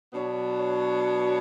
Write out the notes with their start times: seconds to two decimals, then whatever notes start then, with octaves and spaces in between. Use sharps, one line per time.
0.14 B2 F#3 B3 D4 C#5
0.61 C#5